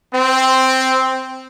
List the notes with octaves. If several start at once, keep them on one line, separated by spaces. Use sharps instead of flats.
C4